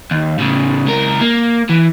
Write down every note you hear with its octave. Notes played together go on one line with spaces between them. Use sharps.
D#2
A2 C#3
C#2 A#4
A#3
E3